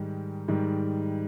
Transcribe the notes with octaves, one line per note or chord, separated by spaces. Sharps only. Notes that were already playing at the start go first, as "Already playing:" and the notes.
Already playing: G#2 D#3 G3
G#2 D#3 G3